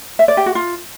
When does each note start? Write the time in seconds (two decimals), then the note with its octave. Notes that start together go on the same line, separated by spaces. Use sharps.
0.19 E5
0.28 D5
0.37 G4
0.46 F#4
0.55 F4